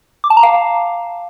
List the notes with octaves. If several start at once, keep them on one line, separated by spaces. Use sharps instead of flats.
D6
A5
A#5
F5